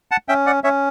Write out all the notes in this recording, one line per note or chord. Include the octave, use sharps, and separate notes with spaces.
F#5 A5
C#4 E5 G5
D5 F#5
C#4 C#5 E5